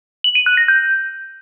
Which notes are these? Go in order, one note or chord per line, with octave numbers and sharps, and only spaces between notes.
F#7
D#7
F#6
A#6
G6